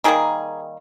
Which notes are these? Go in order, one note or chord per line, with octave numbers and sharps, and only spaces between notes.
D#3 G3 A#3 G#4